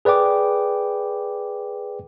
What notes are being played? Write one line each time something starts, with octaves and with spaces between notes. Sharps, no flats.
G#4 B4 D5 G5 D6